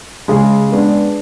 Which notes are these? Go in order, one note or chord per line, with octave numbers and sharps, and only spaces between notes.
C#3 G#3 G#4
G#3 B3 D4